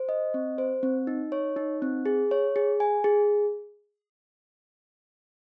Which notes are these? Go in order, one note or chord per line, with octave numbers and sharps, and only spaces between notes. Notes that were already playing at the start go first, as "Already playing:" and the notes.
Already playing: C5
D#5
C4
C5
C4
D#4
C#5
D#4
C4
G#4
C#5
G#4
G#5
G#4